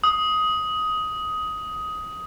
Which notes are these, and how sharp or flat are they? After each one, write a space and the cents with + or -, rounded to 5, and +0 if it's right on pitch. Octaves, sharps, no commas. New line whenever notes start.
D#6 +15